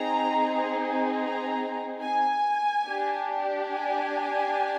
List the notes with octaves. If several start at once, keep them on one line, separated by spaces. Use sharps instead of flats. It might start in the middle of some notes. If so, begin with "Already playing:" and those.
Already playing: C4 D#4 G#4 A#5
A#5
G#5
D4 G4
G#5